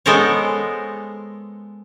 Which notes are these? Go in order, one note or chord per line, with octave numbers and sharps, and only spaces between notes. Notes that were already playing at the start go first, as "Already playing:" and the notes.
G#3 B3 A4 A#4 C5 C#5